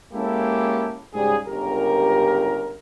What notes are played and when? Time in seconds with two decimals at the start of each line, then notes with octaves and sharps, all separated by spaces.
0.14 G#3 A#3 C#4 E4 G4 A4
1.14 G#2 C#3 G3 G#4
1.47 G1 C#2 G4 A#4